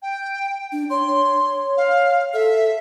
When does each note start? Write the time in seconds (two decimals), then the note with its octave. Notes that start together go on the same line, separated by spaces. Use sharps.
0.02 G5
0.72 D4
0.90 C#5 C6
1.77 F5
2.34 A4 E5